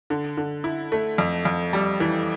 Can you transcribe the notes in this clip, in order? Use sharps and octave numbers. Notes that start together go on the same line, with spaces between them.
D3
D3
E4
A3
F2
F2
G3
E3